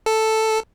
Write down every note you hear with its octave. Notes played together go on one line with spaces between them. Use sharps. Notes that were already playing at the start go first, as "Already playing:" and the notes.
A4